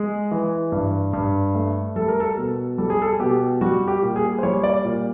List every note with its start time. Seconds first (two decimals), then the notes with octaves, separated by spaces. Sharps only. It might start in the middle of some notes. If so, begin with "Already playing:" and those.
Already playing: G#3 G#4
0.31 E3
0.72 G2
1.13 G2
1.55 A3
1.96 G3 A4
2.08 A#4
2.20 A4
2.37 B2
2.78 G3 A4
2.90 G#4
3.02 A4
3.19 B2 G4
3.61 G3 F#4
3.88 G4
4.02 A#2
4.16 G#4
4.39 C5
4.43 G3 C#5
4.64 D5
4.85 A#2